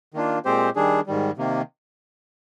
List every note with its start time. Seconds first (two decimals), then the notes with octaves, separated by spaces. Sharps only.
0.14 D#3 A#3 D4 F4
0.45 A#2 G#3 C4 G4 C5
0.76 D#3 G3 D4 G#4
1.07 G#2 D#3 G3
1.37 C3 D#3 A#3